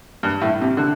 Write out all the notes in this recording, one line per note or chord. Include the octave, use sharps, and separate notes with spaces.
G2
A2
C3
D3